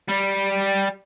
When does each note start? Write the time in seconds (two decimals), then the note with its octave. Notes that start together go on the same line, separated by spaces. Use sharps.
0.09 G3